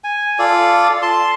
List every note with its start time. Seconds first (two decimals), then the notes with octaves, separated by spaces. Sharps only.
0.04 G#5
0.39 F4 A4 D5
1.02 A5 C6